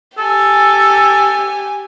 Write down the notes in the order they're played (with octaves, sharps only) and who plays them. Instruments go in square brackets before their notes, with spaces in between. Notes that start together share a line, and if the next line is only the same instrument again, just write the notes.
[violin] G4 G#5 [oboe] A4